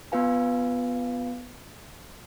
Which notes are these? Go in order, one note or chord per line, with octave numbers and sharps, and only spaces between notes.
B3 F4 B4 F5 G#5